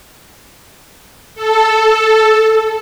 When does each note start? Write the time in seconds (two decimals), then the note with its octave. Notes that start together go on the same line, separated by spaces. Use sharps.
1.35 A4